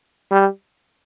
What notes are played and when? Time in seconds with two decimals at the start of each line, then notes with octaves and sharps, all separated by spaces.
0.31 G3